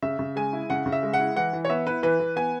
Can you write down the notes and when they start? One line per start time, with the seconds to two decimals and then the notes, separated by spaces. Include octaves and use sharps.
0.02 C#3 E5
0.19 C#3
0.36 G#3 G#5
0.53 E4
0.70 C#3 F#5
0.86 C#3
0.92 E5
1.03 G#3
1.14 F#5
1.20 E4
1.36 E3 F#5
1.53 E3
1.65 C#5
1.69 B3 E5
1.87 E4 B4
2.03 E3 B4
2.20 E3
2.36 B3 G#5